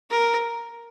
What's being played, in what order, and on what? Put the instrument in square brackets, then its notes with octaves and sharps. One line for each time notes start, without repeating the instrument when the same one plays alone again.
[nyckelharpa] A#4